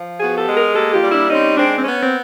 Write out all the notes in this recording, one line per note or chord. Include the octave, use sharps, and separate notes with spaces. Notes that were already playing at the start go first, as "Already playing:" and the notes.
Already playing: F3
B3 F#4 G#4
G4 A4
G#3
G#4 A#4
A#3 G4 A4
F4 G4
G3
D4 E4
C4 C#4 D#4
G#3 C4 D4
C4
B3 C#4
C4